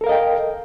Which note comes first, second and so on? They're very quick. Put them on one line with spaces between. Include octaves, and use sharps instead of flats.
A4 A#4 F5 D#5 G5